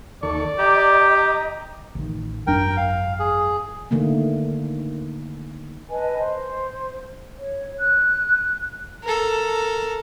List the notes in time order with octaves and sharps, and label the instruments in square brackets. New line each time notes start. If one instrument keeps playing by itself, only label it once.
[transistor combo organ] D#2 A4 C#6 [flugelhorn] D5
[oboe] G4 [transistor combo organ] D#5 A#5
[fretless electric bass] A1 D#3
[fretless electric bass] G#1 F#2 D4 [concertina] A#4 G5
[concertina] F5
G#4
[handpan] D3 D#3 A3 A#3
[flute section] B4 D#5 G#5 A5
C5
C#5
F#6
[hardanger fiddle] A4 A#4